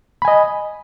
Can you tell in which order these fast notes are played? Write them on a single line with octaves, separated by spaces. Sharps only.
B5 G#5 D#5